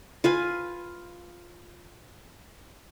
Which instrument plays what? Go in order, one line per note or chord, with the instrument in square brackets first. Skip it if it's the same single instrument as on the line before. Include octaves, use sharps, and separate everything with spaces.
[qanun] F4 B4 G#5